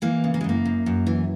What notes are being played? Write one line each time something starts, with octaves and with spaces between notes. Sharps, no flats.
E3 A#3
C#3
A#3
G#3
F#2 A#3
F#2
F#2
E3